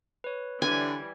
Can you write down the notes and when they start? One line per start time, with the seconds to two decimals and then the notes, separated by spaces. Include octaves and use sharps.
0.24 B4 C#5
0.62 D3 E3 G3 G#5